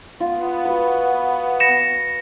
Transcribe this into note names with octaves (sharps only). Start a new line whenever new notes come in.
B3 F4
F#4 B4
A#6 C#7 E7